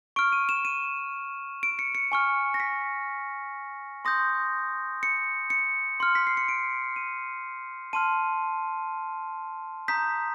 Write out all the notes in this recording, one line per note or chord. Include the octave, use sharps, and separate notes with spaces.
C#6 F6 D7
D#7
E7
D#7
D7
C#7
C#7
G#5 C#6 F6
A#6
B6
C6 D#6 G6 A#6
C#7
C#7
C6 F6
B6
C7
C#7
D7
D#7
A5 C6 F6 D#7
A#5 D#6 G6 B6